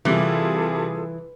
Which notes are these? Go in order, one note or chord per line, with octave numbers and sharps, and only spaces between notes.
C3 E3 G3 F4 G#4 A4